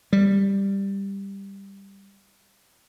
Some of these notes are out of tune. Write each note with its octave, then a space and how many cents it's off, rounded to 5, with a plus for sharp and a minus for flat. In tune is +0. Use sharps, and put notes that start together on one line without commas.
G3 +10